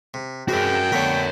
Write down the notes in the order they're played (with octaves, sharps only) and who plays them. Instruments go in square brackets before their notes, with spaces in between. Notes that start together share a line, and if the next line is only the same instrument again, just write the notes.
[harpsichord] C3
[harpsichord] C3 E3 G#3 [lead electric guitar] F#4 A#4 [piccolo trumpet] G5
[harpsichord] D3 A3 B3 [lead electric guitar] A#4 C#5